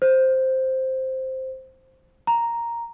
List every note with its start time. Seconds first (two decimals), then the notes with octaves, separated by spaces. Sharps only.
0.02 C5
2.27 A#5